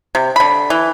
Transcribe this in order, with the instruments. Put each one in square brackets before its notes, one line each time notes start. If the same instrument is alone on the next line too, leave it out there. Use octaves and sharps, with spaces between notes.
[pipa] C3
D3 B5
E3